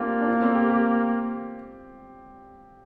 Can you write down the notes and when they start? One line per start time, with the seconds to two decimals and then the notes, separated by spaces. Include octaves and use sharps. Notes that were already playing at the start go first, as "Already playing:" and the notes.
Already playing: A#3 C4 D4 F4 G4
0.21 D4
0.28 F4
0.42 C4
0.55 G4
0.70 G4